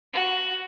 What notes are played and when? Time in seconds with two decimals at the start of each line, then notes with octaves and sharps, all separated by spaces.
0.13 F#4